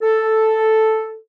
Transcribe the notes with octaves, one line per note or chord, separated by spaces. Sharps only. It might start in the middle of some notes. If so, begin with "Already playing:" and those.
A4